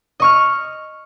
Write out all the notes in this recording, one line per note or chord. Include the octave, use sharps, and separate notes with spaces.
D#5 C#6 F6